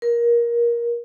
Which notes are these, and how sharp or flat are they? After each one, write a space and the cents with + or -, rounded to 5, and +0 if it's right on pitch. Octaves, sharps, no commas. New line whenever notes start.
A#4 +20